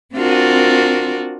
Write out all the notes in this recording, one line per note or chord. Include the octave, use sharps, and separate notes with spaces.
C4 D4 F4 F#4 A#4